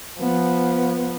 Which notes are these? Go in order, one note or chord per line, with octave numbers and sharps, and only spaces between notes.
F3 B3